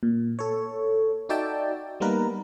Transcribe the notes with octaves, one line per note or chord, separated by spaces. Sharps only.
A#2
A4 C#5
D#4 F#4 D5 E5 G5 A5
G3 A#3 B3 D#4 A#4 B4